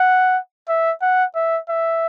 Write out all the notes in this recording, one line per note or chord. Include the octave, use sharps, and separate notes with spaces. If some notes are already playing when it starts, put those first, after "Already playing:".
Already playing: F#5
E5
F#5
E5
E5